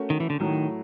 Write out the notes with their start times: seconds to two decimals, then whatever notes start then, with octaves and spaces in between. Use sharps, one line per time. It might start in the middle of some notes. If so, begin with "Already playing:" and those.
Already playing: A3 C#4 F#4 A#4
0.10 D#3
0.20 E3
0.30 D3
0.40 A2 D#3 F#3 A3